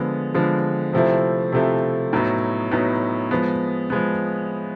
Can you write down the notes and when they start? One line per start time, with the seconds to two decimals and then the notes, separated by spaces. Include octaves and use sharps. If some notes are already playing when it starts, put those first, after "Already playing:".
Already playing: D3 F3 G#3 B3
0.34 D3 F3 G#3 B3
0.93 C3 F3 A3 C4 E4
1.52 C3 F3 A3 C4 E4
2.13 A2 F#3 B3 D#4
2.71 A2 F#3 B3 D#4
3.31 F3 G#3 B3
3.90 F3 G#3 B3